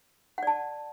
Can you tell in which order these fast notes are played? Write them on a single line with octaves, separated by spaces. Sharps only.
F#5 D5 A5